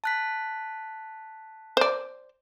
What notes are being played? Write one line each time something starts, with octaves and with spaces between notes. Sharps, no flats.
A5 F#6 B6
C5 D5